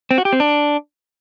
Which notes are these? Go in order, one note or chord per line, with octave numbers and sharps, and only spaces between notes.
C4
F#4
G4
C4
D4